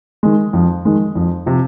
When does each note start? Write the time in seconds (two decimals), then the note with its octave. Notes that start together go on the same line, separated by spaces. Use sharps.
0.23 D#3 G#3
0.53 F2
0.85 D#3 G#3
1.15 F2
1.46 C3 F3